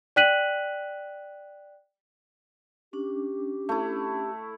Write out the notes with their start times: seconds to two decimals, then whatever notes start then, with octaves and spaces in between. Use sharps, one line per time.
0.16 D5 G5 F#6 B6 D#7 F#7
2.93 C#4 D4 G4
3.69 A3 E4